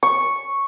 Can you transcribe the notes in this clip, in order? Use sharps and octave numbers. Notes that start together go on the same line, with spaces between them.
C#6